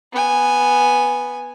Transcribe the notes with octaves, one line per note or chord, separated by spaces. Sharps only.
B3 G#5